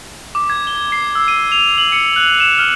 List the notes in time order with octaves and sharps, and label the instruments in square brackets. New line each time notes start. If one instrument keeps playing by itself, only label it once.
[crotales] D6
G#6
G7
C7
E6
D#7
F7
F#7
C#7
F#6
E7
F6